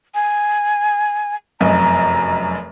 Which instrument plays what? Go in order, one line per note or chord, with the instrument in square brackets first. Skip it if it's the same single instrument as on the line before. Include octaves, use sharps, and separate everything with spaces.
[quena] G#5
[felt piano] F1 F#2 D#5 [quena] A#5